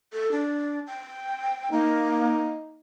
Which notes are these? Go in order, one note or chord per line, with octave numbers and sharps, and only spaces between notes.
A4
D4
G5
A#3 D#4